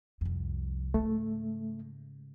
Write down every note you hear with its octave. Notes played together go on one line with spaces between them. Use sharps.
C2 F2
G#2 C#3 A3